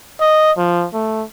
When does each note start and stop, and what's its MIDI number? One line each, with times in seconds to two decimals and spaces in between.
0.20 0.52 75
0.58 0.86 53
0.94 1.24 57